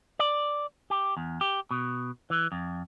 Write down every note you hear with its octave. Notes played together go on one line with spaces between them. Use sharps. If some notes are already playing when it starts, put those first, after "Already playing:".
D5
G4
E2
G4
B2
E3
F2